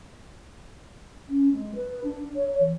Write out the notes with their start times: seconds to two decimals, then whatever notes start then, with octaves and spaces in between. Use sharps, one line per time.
1.28 C#4
1.52 G#3
1.74 B4
2.03 D4
2.35 C#5
2.59 E3